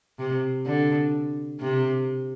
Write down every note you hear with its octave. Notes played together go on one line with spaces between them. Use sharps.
C3
D3
C3